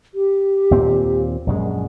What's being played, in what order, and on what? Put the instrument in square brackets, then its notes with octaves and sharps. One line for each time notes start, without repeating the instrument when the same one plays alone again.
[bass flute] G4
[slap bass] D#2 A#2 C4
A#1 F#2 G#3